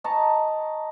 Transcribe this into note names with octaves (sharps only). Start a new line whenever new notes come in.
D#5 A5 A#5 C#6